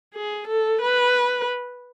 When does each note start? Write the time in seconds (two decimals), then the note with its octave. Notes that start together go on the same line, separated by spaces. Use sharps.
0.14 G#4
0.48 A4
0.82 B4